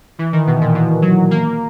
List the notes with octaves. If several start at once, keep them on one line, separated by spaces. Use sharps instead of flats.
E3
D#3
B2
A#2
B2
F#3
A#3